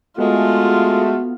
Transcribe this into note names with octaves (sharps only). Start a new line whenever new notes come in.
G#3 A3 B3 F4 F#4